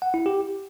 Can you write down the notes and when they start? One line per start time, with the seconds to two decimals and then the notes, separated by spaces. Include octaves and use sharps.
0.02 F#5
0.14 E4
0.26 G4